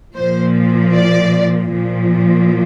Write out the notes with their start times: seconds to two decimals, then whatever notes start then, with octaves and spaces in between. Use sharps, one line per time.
0.16 A#2 F3 C5
0.95 D5
1.74 A#2 F3